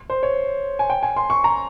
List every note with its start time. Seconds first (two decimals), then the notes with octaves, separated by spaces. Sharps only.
0.10 C5
0.23 C#5
0.79 G#5
0.90 G5
1.03 G#5
1.16 C6
1.30 C#6
1.44 A#5